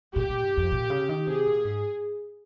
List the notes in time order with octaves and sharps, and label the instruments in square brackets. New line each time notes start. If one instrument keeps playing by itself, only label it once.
[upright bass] A#2 [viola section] G4
[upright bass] A#2
G2
F2
A#2
C#3
D#3
[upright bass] C3 [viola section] G#4
[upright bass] A#2
G#2